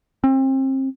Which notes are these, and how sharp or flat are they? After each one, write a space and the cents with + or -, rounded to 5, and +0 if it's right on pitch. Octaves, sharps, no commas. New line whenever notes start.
C4 +30